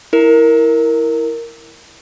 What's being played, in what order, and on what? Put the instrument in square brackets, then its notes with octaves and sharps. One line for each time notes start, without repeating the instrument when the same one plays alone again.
[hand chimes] E4 A#4